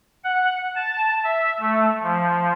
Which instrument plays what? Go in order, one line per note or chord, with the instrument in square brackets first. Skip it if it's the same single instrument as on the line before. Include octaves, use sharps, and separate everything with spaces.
[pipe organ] F#5
A5
E5
A3
F3